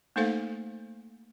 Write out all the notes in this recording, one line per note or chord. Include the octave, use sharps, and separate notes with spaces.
A3 A#3 D#4 A4 C5 F5